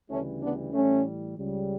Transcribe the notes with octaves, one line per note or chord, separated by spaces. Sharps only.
D2 C#3 E3 G3 A3 C#4
B3 D4
A2 E3 G3 A3 C#4
C#2 C#3 G3